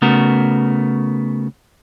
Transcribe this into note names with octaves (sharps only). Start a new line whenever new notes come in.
C#3 A3 B3 F#4 A#4